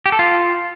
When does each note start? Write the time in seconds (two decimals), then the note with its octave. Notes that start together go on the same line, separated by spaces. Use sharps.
0.06 G4
0.12 A4
0.19 F4